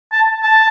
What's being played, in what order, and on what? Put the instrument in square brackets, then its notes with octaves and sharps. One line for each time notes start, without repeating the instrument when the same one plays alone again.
[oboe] A5
A5